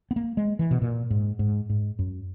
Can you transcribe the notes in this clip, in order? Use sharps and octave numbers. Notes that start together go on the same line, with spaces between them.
B3
A#3
G#3
E3
B2
A#2
G#2
G#2
G#2
F#2